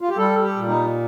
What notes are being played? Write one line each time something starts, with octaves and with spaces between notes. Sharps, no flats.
F4
G4
G3 A4
G4
A#2
D#4